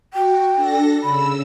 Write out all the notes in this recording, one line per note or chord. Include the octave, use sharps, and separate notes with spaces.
F#4 G5
D4 A4 A#6
C#3 B5 E6